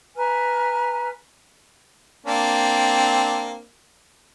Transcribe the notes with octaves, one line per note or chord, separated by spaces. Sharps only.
B4 G#5 A#5 F6
A#3 C4 D4